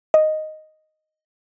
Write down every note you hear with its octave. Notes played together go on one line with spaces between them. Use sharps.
D#5